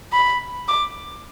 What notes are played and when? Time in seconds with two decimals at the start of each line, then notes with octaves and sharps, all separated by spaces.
0.13 B5
0.68 D6